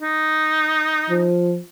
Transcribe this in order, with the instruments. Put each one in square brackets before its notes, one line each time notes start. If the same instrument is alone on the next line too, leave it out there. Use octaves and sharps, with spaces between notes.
[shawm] D#4
[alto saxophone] F3